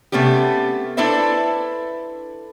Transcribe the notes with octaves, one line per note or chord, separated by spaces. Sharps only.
C3 A3 B3 C#4 G4
D4 E4 A4 B4 C5 E5